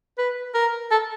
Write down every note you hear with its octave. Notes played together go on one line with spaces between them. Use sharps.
B4
A#4
A4